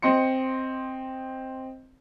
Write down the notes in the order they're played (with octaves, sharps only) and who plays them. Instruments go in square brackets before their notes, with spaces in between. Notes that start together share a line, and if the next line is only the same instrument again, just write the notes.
[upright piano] C4 D#5 C6 C#7